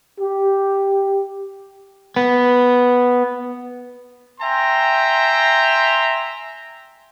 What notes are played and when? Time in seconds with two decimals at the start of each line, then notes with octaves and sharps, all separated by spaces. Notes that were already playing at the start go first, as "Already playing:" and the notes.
0.20 G4
2.16 B3
4.41 E5 G5 G#5 A#5 C6